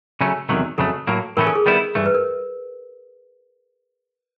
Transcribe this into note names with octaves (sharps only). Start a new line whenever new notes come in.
C#3 F#3 A3 C#4
E2 C3 D#3 F#3 A3
F2 C#3 F#3 A3 A4
A2 F#3 A#3
A2 E3 A3 C#4 A#4
A4
G#4
D#3 G3 B3 E4
G2 E3 A3
B4
A#4